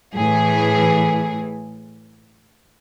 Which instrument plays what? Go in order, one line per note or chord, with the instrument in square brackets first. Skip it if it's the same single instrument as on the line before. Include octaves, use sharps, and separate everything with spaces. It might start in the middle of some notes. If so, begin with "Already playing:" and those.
[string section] A2 E3 G#4